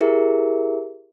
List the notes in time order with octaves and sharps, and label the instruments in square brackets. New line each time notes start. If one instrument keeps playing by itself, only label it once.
[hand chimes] E4 G4 G#4 A#4 E5